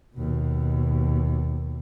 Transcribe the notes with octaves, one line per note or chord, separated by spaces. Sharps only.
D#2 B2